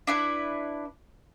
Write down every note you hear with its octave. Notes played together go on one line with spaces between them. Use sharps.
D4 E4 B4